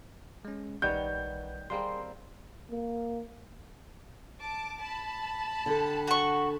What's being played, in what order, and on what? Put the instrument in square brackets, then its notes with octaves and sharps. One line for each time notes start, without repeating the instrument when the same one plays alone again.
[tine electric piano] G#3 C#4
[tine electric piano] A#1 B4 F#5 [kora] D#3 G3 C#5 [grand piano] G6
[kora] G3 A#3 C4 [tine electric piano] G#4 A#4 C6
[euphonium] A#3
[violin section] A5 D6
A5 B5
[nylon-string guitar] D3 G4 A4
[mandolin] F#4 C#6